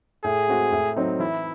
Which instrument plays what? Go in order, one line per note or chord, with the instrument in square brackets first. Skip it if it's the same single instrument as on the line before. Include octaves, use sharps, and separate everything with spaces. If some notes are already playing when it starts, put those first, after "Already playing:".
[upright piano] A2 [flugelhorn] G#4
[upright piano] G#3 C4 F#4
A2
F#3 C4 D#4
[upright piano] E3 [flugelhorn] E4